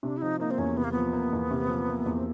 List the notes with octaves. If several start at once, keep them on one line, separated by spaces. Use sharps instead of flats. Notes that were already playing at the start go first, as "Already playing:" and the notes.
C3 D4
E4
F3 D#4
A#3 D#4
C4
E2 C#4
C3 B3
A#3
F3 B3
A#3
E2
C3
F3
A#3
E2
C4